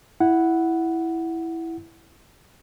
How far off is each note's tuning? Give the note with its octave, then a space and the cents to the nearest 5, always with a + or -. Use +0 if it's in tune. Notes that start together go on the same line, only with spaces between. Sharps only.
E4 +0 F#5 +0